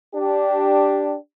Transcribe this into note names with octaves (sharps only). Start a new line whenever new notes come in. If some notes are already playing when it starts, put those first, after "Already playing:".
D4 G4